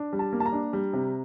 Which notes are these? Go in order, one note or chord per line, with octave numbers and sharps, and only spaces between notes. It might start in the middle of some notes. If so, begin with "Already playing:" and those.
Already playing: D4
G3
A5
A#3
A5
A#5
D4
G3
C3